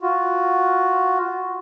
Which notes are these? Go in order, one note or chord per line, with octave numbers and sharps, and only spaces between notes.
F4 F#4